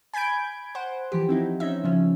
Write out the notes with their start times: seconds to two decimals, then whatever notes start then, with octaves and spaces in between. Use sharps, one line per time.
0.14 G#5 B5 G6 G#6 D7
0.75 C5 F#5
1.12 E3 F3 G4
1.29 C4 D#4 E4
1.60 C#4 D#4 E5
1.84 C#3 F3 C#4